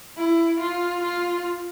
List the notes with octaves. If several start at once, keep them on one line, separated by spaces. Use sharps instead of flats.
E4
F4
F4